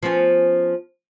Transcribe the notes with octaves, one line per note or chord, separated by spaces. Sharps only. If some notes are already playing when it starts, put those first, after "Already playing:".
F3 B3 C#4